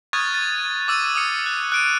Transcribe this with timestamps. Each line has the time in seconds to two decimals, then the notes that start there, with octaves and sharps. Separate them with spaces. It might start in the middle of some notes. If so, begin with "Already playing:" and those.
0.13 C#6 D#6 F6 F#6 G#6 A6
0.34 A6 D#7
0.88 D6 E6 D#7
1.15 D#6 F6 C#7
1.46 F#6
1.72 F#6 D7 D#7